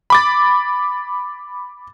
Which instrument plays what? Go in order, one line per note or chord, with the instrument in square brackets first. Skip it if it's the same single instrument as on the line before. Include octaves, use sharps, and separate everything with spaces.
[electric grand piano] B5 D6 A6